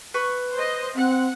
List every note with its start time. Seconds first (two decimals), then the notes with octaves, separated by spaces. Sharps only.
0.14 B4 C#6
0.52 C5 D#5
0.95 C4 F#5